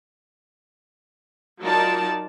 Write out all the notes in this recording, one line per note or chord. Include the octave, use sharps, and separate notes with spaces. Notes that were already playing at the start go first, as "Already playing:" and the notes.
F#3 D#4 F4 A#4 D5 A5